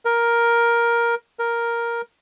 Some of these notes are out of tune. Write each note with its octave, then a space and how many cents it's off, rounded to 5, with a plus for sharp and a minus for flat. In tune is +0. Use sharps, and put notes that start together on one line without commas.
A#4 +10
A#4 +5